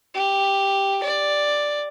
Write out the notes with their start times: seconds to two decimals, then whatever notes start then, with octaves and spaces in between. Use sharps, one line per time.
0.14 G4
1.03 D5